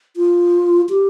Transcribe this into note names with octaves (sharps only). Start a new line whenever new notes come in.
F4
G4